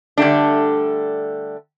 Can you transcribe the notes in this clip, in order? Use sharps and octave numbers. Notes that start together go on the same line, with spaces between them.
D3 G3 A3 D4